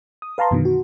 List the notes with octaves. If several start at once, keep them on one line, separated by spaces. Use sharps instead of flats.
D#6
B4 F5 A5 A#5 C6
F#2 B2 D3 D#3
F#4